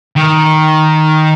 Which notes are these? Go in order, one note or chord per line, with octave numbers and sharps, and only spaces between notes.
D#3